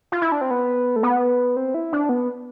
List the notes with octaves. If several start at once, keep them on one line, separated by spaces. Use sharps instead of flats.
F4
E4
D4
C4
B3
A3
B3
C4
E4
D4
B3